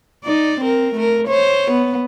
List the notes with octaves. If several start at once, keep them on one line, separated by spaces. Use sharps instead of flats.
D#4 D5
C4 A#4
A3 A#4
C5 C#5
B3